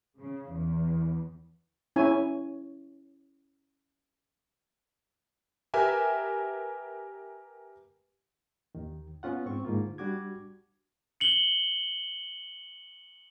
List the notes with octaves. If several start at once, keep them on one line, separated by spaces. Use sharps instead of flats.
C#3
E2
C#4 E4 C#5 G#5
G4 A#4 B4 E5 G#5
D#2 D#3
B3 C#4 F4 F#5
G#2 C4 C#6
G#2 D3 A#3 F4
G3 D4 F#4 D6 G#6
C#7 F#7 G7